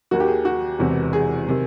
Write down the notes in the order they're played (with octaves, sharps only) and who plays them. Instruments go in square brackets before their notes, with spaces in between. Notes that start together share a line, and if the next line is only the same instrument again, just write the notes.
[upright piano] D#2 D#3 F#4
G4
G#4
F#4
E1 E2 C3 E3
G#4
C3 D#3